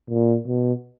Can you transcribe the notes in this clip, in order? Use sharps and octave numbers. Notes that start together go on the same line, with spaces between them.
A#2
B2